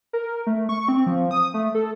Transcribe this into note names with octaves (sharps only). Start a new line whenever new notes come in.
A#4
A3
C#6
C4
F3
D#6
A3
A4